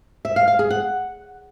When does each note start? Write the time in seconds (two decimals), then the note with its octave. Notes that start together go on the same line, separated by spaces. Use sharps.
0.25 E5
0.36 F5
0.48 F5
0.59 G#4
0.70 F#5